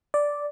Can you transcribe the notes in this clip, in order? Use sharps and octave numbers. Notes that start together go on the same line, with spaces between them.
D5